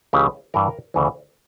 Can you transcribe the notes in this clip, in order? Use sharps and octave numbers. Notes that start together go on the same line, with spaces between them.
C#2 C#3 E3 G4
G2 E3 A#4
D2 C#3 E3